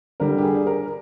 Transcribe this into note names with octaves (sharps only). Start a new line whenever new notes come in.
D3 G3 A#4
G4
G#4
A#4